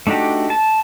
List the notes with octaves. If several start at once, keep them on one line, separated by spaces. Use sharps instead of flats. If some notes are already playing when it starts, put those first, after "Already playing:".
A3 D4 D#4 F#4 G4
A5